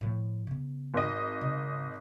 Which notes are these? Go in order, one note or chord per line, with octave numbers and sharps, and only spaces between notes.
A2 F3
C#3 B3
G#1 D#5
C#3